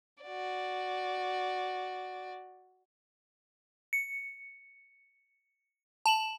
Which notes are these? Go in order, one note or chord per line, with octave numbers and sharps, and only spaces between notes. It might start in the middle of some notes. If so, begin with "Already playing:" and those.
F#4 D5
C#7
A5 E7 F#7